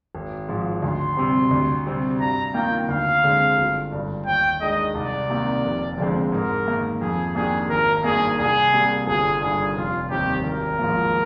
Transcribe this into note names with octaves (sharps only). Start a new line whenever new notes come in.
G#1
G#2 F3
D2 C6
C3 G3 C4
D2
C3 G3 C4
G2 A#5
D#3 A#3 F4 G5
D2 F5
D3 G#3 C4
G1
G2 D3
D#2 G5
D#3 G#3 D4 D#5
C2 D5
C3 D#3 A#3
F1
F2 D3 G#3 C4
G#2 A#4
D#3 A#3
F2 G#4
D#3 A#3 D4 G4 G#4
G#1 A#4
G2 D#3 A#3 G#4
C2 G#4
C3 G3 A#3
G1 G#4
G2 D#3 G3 G#4
F1 F4
D#2 D#3 G3 C4 G4
G#1 A#4
G#2 F3 A#3